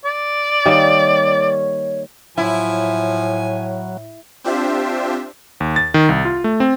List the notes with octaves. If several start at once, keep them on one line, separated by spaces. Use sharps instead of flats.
D5
D#3 G3 A#3 C#5
A2 F3 F#3 E4 G#5
C4 D4 F4 G4 C5 E5
D#2
A6
D#3
C2
F4
A3
C4